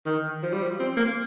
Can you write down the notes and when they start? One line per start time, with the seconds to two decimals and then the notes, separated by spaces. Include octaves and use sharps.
0.06 D#3
0.43 F3
0.53 G3
0.63 F3
0.80 C4
0.97 A#3